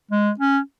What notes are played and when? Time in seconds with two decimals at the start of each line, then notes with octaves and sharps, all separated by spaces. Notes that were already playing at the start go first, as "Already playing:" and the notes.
0.11 G#3
0.39 C#4